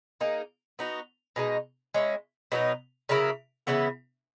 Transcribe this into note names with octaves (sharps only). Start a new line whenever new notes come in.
A#3 D#4 G#4
B3 D#4 F#4
B2 G#3 D#4
G#3 C#4 E4
B2 F#3 B3 D#4
C#3 F#3 A#3 E4
C#3 E3 B3 E4